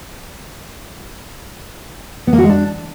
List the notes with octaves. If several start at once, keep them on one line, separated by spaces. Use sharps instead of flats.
B3
A#3
F#4
G#3
D4